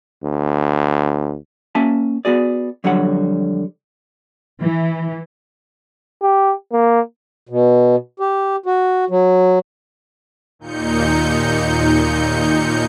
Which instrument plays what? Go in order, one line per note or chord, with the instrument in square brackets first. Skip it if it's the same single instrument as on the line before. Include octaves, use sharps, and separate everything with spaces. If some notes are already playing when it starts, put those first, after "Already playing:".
[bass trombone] D2
[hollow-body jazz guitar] A#3 C#4 E5 G#5 A5
B3 F#4 G#4 D5
F2 D3 F#3 G3 C#5 F#5
[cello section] E3
[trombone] G4
A#3
[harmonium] B2
G4
F#4
F#3
[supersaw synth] D#2 A#2 D#4 G6 C#7